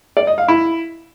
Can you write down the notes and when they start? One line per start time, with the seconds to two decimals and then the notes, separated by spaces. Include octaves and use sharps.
0.17 D5
0.27 D#5
0.38 F5
0.48 E4